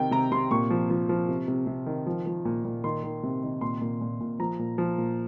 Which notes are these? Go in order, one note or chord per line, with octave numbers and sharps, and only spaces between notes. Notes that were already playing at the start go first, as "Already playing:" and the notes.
Already playing: C3 D#3 G5
C3 A#5
C3 C6
A#2 C#6
F3
F3
F3
C3
C3
C3
D#3
F3
F3
A#2
A#2
D#3 C6
D#3
C3
D#3
A#2 C6
A#2
A#2
A#2
F3 A#5
A#2
F3
A#2